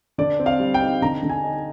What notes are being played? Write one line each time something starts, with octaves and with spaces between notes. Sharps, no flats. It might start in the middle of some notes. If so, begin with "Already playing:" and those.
D3 D5
C4
F5
G3
G5
D#4
D3 A#5
D3
G#5
D#4